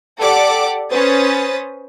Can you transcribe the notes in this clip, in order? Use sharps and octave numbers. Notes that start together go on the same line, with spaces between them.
G4 A4 D5 F#5 D6
C#4 B4 C5 D#6 A6